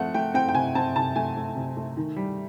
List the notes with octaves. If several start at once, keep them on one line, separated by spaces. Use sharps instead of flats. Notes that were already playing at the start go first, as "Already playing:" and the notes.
Already playing: F3 A3 C4 F#5
A3 G5
C4 G5
G5
C3 G#5
C4 A5
C3 A5
A3 G#5
A3
C3
A3
D#3
G3